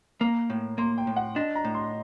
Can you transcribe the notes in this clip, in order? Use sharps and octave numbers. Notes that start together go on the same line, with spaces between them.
A#3 A#5
A2
A#3 C6
G5
A2
F#5
D4 D#5
A#5
A2
C6